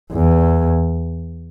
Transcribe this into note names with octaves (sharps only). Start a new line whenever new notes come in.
E2